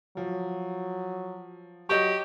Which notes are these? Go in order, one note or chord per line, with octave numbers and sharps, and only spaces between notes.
F3 F#3
F#3 G4 D#5 C#6